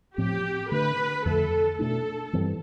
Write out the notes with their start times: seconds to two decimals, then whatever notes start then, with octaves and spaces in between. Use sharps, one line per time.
0.17 A2 F3 C4 G4
0.71 D3 A3 D4 B4
1.25 F2 D3 A3 A4
1.79 B2 A3 D4 A4
2.33 G2 E3 G3 C4